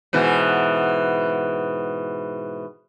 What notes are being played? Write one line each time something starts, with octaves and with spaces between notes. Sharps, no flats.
G#2 B2 E3